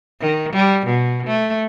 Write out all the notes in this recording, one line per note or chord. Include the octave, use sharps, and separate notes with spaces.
D#3
G3
B2
A3